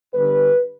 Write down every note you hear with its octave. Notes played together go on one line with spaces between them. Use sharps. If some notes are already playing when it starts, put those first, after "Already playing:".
G1 G2 D3 B4